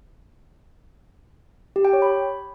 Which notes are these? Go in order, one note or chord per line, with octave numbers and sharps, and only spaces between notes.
G4
G5
C#5
B5